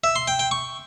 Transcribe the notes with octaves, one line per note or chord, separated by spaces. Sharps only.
E5
C6
G5
G5
C#6